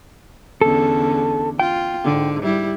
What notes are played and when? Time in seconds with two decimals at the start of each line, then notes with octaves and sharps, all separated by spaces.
0.61 E2 D3 C#4 A4
1.60 F4 G5
2.04 G#2 D3
2.42 G3 E4